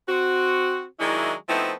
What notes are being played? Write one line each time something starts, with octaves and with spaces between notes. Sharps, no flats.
C4 F#4
D#3 F#3 G#3 D4 E4
F3 A3 B3 C4 D#4 E4